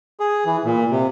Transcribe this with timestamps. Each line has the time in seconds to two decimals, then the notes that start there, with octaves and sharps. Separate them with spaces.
0.20 G#4
0.45 E3
0.64 A#2
0.91 C3